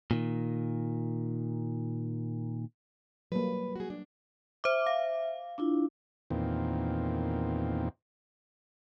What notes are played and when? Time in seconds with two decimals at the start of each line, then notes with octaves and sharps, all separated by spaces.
0.11 A#2 D#3
3.32 F#3 G3 A#3 B4
3.75 F#4 G#4
3.90 D4
4.64 C5 E5 D6
4.86 F5
5.58 D4 E4 F4
6.31 E2 A#2 D#3 C4